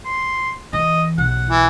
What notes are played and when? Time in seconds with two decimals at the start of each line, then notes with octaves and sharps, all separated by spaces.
0.05 C6
0.73 E3 D#5
1.18 B1 F#5
1.49 E3